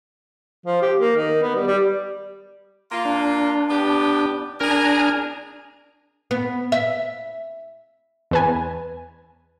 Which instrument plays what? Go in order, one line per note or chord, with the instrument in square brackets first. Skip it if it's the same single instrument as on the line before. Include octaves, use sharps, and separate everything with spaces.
[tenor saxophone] F3
G4
A#3
D#3
B3
G3
G3
[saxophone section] A#3 F4
[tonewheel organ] D4
[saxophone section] B3 G4
[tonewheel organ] D4 G#5 A#5 [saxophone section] G#4 A#4
[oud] B3
E5
[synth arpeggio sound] E2 B4 G#5